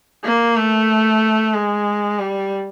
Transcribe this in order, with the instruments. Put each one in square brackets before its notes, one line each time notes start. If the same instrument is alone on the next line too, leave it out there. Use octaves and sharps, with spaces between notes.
[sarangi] A#3
A3
G#3
G3